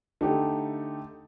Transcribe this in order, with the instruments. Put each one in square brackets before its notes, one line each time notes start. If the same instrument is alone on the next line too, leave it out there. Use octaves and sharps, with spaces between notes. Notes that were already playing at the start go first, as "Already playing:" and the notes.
[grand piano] D3 A3 D#4 G4